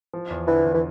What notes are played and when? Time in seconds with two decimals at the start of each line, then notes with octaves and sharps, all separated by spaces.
0.14 F3
0.30 E2
0.47 D3 E3
0.65 E2
0.74 E3